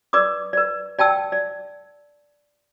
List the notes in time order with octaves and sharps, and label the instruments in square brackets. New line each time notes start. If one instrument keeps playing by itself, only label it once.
[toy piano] B4 D5 D6 D#6
B4 D5
D5 G5 A5 E6
D5